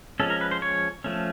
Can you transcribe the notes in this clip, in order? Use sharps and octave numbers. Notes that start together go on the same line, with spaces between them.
F3 G#3 C#4 A4
A#4
B4
C5
C#5
F3 A3 C#4